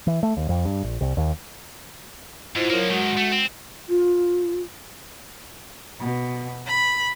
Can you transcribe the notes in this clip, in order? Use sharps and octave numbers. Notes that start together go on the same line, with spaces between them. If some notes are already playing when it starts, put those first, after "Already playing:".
E3
A3
D#2
F2
G2
A#1
C2
D#2
G#2 E4 F4 C5
F3 F#3 A#3 A#4 C#5
G#2 D#3 G#3 F#4 F#5
A3
C4
F4
B2
B5